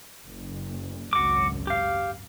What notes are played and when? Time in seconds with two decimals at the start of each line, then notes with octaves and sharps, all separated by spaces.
0.26 F#1
1.13 G#1 C#2 F#2 F#4 D6
1.67 G4 F5